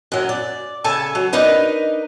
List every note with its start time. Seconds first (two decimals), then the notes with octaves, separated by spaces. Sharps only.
0.12 F#2 F#3
0.29 D5
0.84 C#3 A4 G#5 A5
1.15 F#3
1.33 D4 D#4 A#4 B4 D#5